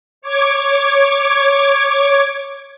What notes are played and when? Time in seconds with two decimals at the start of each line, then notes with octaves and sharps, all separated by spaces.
0.22 C#5 D6 G#6